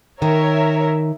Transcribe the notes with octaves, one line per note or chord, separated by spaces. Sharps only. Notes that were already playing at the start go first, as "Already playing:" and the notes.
D#3 A#4 C#5 E5